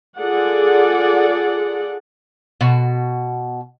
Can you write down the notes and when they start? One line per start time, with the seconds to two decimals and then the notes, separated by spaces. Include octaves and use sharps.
0.17 F4 G#4 A4 D5 F#5
2.61 B2 F#4